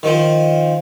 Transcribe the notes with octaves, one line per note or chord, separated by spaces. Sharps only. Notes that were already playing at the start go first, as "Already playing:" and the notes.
D#3 F3